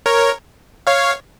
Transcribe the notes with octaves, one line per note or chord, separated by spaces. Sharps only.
A#4 C#5
C#5 F5